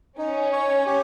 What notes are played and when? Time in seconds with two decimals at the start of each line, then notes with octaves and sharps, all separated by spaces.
0.18 C#4 D#4
0.53 C#5
0.86 G4